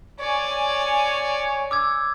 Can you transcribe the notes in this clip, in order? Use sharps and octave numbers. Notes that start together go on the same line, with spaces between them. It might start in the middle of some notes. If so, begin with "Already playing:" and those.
C#5 D5 G#5
D6 E6 G#6